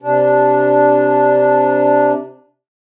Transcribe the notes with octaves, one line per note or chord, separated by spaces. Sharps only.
C3 D4